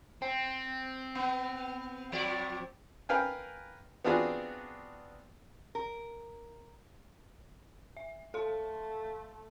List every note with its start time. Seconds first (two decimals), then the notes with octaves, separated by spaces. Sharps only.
0.22 C4
1.15 B3
2.12 F3 D5
3.09 A#4 B4 F5 G5 G#5
4.05 B3 C4 D4 F4 F#4 G#4
5.75 A#4
7.97 E5
8.34 A3 A4 F5 C6